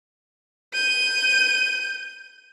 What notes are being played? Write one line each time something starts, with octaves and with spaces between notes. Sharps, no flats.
G6 D#7